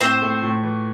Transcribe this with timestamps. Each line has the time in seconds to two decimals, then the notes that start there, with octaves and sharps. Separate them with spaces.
0.01 A2 C4 C5
0.22 A3
0.43 A2
0.63 E3